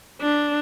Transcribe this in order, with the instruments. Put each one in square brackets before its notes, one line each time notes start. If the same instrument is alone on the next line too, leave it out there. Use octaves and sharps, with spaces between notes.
[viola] D4